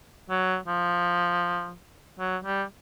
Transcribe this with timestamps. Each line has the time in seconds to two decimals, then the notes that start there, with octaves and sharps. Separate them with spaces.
0.30 F#3
0.67 F3
2.19 F#3
2.45 G3